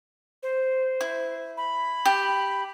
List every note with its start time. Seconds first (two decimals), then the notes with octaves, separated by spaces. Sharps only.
0.43 C5
1.01 E4
1.57 B5
2.05 G4